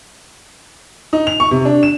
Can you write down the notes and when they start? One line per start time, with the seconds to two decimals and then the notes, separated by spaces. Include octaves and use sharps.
1.13 D#4
1.27 F7
1.40 C#6
1.51 C3
1.65 D4
1.83 E7